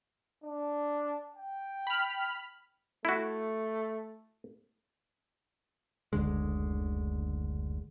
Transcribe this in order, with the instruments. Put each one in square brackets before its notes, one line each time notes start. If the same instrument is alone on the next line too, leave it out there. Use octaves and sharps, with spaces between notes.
[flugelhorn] D4
G5
[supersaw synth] B5 F6
[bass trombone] A3 [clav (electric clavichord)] E4 F#4
[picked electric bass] F#1 D2 D3 G#3